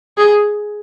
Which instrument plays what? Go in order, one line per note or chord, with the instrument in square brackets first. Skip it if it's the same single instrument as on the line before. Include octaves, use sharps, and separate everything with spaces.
[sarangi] G#4